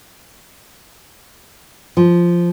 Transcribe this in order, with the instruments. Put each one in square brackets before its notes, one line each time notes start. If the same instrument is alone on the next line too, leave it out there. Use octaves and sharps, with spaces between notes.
[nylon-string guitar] F3